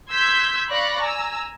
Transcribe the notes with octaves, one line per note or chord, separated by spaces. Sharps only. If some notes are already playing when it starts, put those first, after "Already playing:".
C6 E6 G6 G#6 B6
D5 F5 B5 C#6 F#6 A#6
G#5 A#5 E6